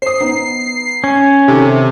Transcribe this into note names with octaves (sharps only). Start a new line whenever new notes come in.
C5 D#6 C7
B3 D#4
C#4
C3 D#3 A4